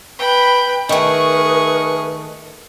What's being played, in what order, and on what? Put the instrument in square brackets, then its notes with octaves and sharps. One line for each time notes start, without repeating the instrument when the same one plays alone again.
[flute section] B4 [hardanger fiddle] G5 B5
[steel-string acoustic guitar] D#3 A3 [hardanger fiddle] G#4 C#6 [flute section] A#4 B4 D#6